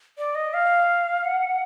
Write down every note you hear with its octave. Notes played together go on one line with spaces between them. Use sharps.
D5
D#5
F5
F#5